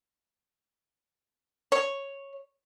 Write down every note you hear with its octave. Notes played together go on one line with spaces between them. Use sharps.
C#5